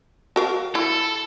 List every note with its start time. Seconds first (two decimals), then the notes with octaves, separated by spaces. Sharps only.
0.36 F#4 A#4 F5
0.75 E4 A4